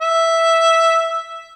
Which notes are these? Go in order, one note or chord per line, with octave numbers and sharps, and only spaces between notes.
E5